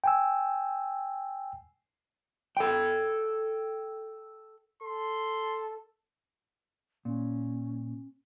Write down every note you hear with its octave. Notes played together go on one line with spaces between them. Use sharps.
G5 G#5 E6
A4 G5
A4 C6
A#2 C#4